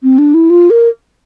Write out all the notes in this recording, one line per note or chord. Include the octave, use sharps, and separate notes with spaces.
C4
D4
E4
F4
A#4